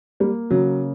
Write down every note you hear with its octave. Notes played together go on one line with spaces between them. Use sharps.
G3 A#3
C#3 F#3